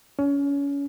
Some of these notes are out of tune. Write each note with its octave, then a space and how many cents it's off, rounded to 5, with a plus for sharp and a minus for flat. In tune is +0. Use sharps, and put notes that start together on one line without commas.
C#4 +30